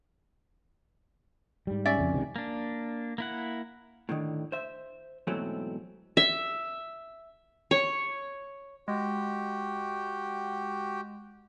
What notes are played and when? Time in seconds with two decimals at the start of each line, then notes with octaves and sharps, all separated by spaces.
1.67 G#2 G3
1.85 C#4 D5 E5
1.98 F2 C#3
2.13 C#2 C3 D#3
2.36 A#3 D4
3.18 A#3 E4 F#5
4.09 A2 D3 D#3
4.52 C5 E5
5.27 G#2 B2 E3 F#3 A3 C4
6.17 E5
7.71 C#5
8.88 G#3 F#4 G4 G5